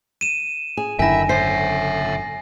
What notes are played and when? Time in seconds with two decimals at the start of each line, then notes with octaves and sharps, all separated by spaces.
0.21 D#7 E7
0.77 G#4
0.99 F#1 F#2 D3 D#3 E4 E5 G#5 A#6
1.29 C5 C#5 E5 C7